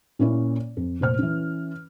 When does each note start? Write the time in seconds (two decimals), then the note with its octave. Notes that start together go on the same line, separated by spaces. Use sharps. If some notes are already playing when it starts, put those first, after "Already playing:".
0.19 A#2 A#3 C#4 E4
0.77 F2
1.00 F1 A#2 C5 F6
1.19 E3 C#4